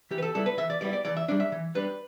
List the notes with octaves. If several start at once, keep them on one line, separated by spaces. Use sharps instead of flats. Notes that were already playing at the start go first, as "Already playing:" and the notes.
E3 G4
B4
A4
G3 B3 E4 A4
B4
E3 E5
D5
G3 B3 E4 D5
D5
E3 D5
E5
G3 D4 D5
E5
E3
G3 D4 B4